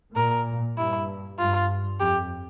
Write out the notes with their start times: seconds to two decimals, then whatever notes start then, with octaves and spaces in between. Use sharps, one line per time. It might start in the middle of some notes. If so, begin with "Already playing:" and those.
0.15 A#2 A#4
0.76 G2 E4
1.39 G2 F4
2.00 F2 G4